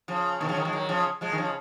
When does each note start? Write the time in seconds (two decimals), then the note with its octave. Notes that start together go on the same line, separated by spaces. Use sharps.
0.08 C#3 F3
0.40 B2 D#3
0.49 C#3 F3
0.57 D#3 F#3
0.65 F3 G#3
0.72 D#3 F#3
0.89 C#3 F3
1.21 F3 G#3
1.32 D#3
1.38 C#3 F3